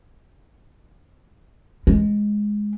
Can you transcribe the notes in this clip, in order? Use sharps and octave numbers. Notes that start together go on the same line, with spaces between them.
G#3